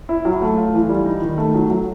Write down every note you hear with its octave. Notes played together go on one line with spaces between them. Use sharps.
E4
F#3
A3
F4
E3
G3
D#4
D#3
A3
F#3
F#3